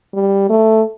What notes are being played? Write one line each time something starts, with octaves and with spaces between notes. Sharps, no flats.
G3
A3